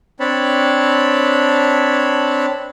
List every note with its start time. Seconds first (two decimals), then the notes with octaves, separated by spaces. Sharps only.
0.20 C4 D4 C#5 A5 B5